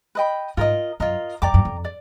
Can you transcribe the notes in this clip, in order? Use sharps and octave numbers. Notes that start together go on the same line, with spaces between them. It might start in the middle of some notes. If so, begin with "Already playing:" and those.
B4 D#5 G5 B5
G#2 F4 A#4 D#5
F#2 F4 A#4 D#5
F2 D5 G5 A#5 D6
F#2
F2
D5